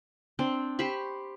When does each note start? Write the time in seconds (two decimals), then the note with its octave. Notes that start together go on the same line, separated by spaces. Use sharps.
0.39 C4 D4 G5
0.79 G4 C5 B5 C#6